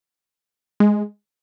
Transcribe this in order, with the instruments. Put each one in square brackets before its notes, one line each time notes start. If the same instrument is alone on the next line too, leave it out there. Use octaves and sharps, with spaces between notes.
[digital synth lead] G#3